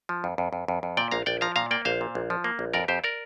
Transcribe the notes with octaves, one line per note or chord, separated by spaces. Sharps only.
F3
F2
F2
F2
F2
F2
A#2 D5 G5
A#1 F5 A#5
A#1 D5 G5
F3 F5 A#5
A#2 F5 A#5
A#3 D5 G5
A#1 C5 F5
A#2
A#1
F3
A#3
A#1
F2 A#4 D5
F2 G4 C5
A#4 D5